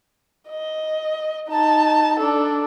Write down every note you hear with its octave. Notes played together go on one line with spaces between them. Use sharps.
D#5
D#4 A5
D4 A4